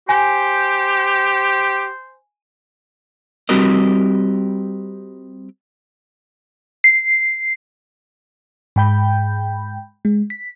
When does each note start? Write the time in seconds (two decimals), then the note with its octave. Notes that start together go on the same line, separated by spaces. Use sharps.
0.09 G4 C5 G#5
3.49 G3 C4 F#4 G4 A#4 D#5
6.84 C7
8.76 G#2 G#3 G5 B5 G6
10.05 G#3
10.30 B6